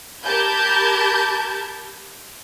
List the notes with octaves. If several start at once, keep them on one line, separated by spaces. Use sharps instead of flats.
G4 A#4 A5 B5 G6 G#6